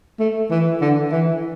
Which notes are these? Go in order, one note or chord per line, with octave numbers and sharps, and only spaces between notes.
A3
E3
D3
E3